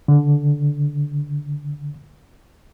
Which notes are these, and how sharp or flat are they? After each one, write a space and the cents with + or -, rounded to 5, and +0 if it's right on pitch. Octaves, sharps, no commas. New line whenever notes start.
D3 -10